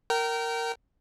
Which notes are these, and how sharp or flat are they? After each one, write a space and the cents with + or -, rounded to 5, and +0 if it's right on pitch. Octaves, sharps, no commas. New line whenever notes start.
A#4 -10 G5 -30